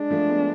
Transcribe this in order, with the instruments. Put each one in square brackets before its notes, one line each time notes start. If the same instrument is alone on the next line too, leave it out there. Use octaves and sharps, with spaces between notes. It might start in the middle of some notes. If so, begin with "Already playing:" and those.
Already playing: [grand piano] G#3 [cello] D4
[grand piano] F3 A3
G#3 B3